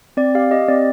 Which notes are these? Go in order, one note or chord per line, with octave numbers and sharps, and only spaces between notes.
C4 D5
G4 F5
G4 D#5
C4 D5